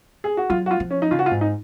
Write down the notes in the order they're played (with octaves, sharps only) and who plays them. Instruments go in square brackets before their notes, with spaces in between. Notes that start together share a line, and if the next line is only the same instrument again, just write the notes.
[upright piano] G#4
F#4
[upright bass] F#3 [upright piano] F4
[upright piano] F#4
F4
[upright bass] F3
[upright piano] C#4
D#4
[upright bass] C#3 [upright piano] F4
[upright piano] F#4
F4
[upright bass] G#2
[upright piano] D#4